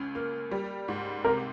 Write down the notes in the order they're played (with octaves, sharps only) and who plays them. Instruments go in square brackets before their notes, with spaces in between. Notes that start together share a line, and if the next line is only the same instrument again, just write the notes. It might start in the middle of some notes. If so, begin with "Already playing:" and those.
Already playing: [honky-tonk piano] C#2 C#4
A#3
G3
G#2
[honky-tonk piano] C3 [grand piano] A#4